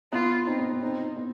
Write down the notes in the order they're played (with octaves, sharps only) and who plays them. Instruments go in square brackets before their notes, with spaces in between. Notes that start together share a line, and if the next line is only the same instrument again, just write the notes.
[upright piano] B3 [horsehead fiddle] F4
[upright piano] C4 [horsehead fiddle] D#4
[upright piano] B3
C4
[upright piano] C4 [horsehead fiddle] D#4
[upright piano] B3